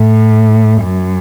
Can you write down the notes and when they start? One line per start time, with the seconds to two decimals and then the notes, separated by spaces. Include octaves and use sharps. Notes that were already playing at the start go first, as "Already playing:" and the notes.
Already playing: A2
0.83 F#2